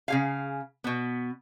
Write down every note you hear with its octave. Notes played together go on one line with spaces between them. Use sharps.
C#3 G#4 F5
B2 B3